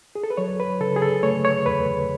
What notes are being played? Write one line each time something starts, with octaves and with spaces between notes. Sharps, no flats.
G#4
A4
B4
F#3 C#5
B4
C#3 A4
G#4
A4
A3 C#5
C#5
E2 B4